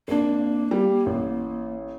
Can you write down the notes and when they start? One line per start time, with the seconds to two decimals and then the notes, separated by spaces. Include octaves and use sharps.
0.08 G#1 A#3 D4
0.71 G3
1.06 A1